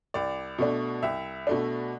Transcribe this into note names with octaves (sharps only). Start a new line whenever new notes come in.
C2 D5
B2 A3 D4
C2 E5
B2 A3 D4